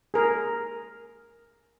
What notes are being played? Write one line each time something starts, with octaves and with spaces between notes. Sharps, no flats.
G#4 A#4